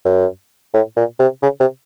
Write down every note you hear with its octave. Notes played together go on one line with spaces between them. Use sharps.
F#2
A2
A#2
C3
C#3
C3